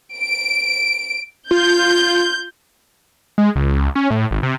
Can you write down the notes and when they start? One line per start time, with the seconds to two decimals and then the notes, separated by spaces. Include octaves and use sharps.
0.17 D7
1.51 F4 G6
3.38 G#3
3.55 C#2
3.72 C#2
3.95 C#4
4.11 A2
4.31 G#1
4.43 C3